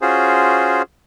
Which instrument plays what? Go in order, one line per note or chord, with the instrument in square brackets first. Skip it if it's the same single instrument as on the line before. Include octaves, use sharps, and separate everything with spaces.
[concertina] C#4 F4 F#4 G#4 C5